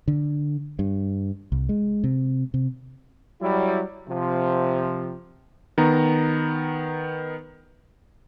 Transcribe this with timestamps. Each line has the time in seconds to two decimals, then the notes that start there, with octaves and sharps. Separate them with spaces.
0.08 D3
0.79 G2
1.52 C2
1.69 G#3
2.04 C3
2.54 C3
3.42 F#3 G3 E4
4.09 C3 F3
5.78 D#3 B3 A#5